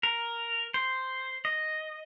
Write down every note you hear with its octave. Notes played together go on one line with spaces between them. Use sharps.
A#4
C5
D#5